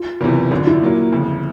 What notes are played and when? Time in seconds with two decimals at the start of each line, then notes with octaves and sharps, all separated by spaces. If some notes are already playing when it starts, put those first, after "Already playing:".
Already playing: F4
0.21 F#1 E2 C3 E3 F4
0.51 G#1 F#2 D3 F4
0.67 E4
0.81 A#2 F#3 A#3
1.12 G1 F2 C#3 F3